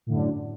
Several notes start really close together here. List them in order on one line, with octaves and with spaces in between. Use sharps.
A2 D3 F#2